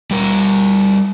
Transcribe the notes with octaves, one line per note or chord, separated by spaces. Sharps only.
G3 A#4